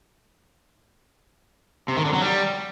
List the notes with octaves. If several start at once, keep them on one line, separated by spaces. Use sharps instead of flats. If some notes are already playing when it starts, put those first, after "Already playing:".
C3
D#3
D3
F#3
G3